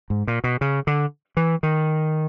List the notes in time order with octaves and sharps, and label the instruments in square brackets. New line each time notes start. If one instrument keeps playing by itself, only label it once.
[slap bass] G#2
A#2
B2
C#3
D3
E3
D#3